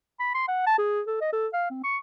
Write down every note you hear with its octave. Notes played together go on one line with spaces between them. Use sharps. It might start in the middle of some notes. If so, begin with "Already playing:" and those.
B5
C6
F#5
A5
G#4
A4
D#5
A4
F5
C4
C#6